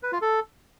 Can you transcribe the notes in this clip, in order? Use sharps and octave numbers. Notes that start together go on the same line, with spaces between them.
B4
F4
A4